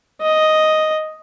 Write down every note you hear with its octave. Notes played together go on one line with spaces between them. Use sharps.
D#5